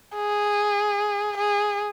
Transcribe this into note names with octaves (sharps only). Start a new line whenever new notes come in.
G#4
G#4